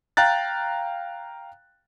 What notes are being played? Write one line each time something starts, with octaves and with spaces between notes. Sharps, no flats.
F5 G5 A#5 F#6 A6